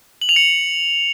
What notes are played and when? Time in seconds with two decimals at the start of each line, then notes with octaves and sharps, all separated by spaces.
0.22 F#7
0.29 F7
0.36 C#7